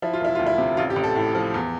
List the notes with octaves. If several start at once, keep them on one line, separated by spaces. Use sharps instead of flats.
F3 E4
F4
E1 E4
D2 F4
E4
C3
A1 F4
G4
A1
A4
A2
F3
E2